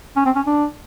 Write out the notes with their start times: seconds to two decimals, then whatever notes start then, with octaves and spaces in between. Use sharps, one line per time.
0.17 C#4
0.26 C4
0.36 C#4
0.47 D4